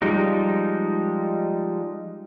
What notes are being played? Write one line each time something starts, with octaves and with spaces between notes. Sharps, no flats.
F3 G3 G#3 D#4